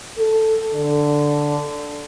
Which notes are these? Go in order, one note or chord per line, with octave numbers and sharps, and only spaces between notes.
A4
D3